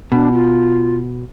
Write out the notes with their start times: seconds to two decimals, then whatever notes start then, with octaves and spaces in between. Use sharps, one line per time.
0.12 B2 D4
0.33 F4